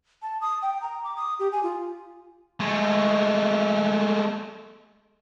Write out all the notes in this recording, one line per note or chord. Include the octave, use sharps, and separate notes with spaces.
A5
D#6
G5
A#5
D6
D#6
G4
G#5
F4
G#3 A3